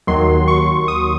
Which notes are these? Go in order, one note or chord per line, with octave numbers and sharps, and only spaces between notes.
D#2 D#3 F#3 C6
C#6
D#6